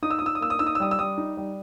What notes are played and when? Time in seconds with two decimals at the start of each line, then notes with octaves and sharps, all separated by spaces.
0.02 D#4 D#6
0.10 E6
0.19 D#6
0.22 D#4 E6
0.35 D#6
0.41 A#3 E6
0.50 D#6
0.59 D#4 E6
0.67 D#6
0.75 E6
0.80 G3 D#6
0.91 E6
0.99 G3 D#6
1.18 D#4
1.37 G3